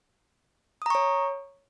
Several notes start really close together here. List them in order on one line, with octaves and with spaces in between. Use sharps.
D#6 A#5 C#6 C#5